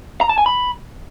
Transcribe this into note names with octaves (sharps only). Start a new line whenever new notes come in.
A#5
A5
G#5
B5